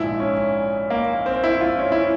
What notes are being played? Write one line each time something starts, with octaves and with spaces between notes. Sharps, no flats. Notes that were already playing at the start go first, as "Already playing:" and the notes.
Already playing: A#1 G#2 F3 E4
C#4
A#3
C4
E4
F4
C#4
E4